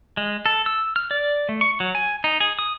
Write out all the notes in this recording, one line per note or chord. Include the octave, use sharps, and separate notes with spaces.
G#3
A4
E6
F6
D5
A3
C#6
F#3
G#5
D#4
G#4
D#6